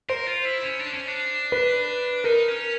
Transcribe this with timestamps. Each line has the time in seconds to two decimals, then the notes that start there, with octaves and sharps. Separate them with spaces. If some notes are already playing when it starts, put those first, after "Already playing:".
0.09 A#4 C5
0.27 F4
0.45 E4
0.63 C#4
0.81 D4
0.94 C#4
1.07 D4
1.52 B4
2.24 D#4 A#4
2.48 C#4